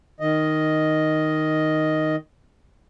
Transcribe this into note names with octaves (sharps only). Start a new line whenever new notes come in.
D#3 D#5